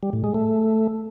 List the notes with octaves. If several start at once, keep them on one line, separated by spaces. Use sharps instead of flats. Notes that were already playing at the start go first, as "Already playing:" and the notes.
G3
A2
G#3
A3